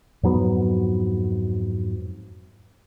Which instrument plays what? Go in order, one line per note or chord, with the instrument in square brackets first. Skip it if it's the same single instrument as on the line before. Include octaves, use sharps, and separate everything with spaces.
[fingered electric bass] F2 G#2 F#3 B3